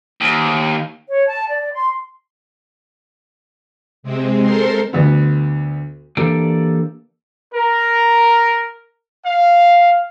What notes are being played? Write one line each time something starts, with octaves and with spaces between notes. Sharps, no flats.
D#2
C#5
A5
D5
C6
C3 G#3 C4
A4 A#4 C5 C6
D2 D3 B3
E3 A#3 D4 G4 A4 D5
A#4
F5